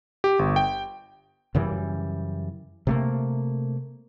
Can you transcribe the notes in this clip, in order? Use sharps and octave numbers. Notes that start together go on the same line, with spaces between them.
G4
G1
G5
F#2 C#3 E3 G3
C3 A3 A#3